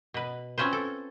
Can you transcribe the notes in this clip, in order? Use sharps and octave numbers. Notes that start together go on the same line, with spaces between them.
B2 B4
C4 C#4 F4 B4 C5
A4